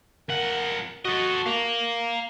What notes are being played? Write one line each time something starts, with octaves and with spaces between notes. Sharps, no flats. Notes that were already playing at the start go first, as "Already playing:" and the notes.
F2 A#4 F#5
F#4 A4 D#5
A#3 F5 A#5